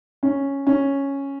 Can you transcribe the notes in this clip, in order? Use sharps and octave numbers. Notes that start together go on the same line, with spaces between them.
C#4
C#4